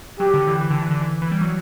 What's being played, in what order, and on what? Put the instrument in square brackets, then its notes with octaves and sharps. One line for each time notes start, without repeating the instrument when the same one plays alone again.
[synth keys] F#3 [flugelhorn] G4
[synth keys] D3
E3
E3
D3
E3
D3
E3
E3
G3
F#3